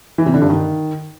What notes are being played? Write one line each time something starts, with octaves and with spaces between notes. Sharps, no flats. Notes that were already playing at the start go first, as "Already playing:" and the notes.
E3
C3
D3
G2
D#3